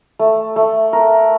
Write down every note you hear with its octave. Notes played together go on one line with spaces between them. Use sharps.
A3
A3
A#4